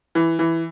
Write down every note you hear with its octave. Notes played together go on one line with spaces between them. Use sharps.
E3
E3